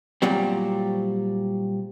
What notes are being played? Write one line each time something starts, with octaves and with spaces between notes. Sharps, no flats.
A#2 F#3 G3 C4